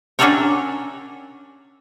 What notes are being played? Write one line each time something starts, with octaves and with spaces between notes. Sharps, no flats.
C#4 D4 F#4 A4 A#4 C#5